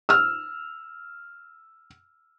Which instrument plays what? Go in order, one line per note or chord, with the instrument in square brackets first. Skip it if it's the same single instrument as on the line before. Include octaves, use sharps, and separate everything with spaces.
[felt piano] E6 F6